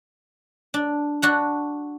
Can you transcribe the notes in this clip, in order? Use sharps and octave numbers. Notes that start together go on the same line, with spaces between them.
D4
D4 F#4 F#5